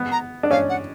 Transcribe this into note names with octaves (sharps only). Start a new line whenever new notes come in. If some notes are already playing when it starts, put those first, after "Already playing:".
Already playing: B3
A#5
D4
C#4 F5
F#5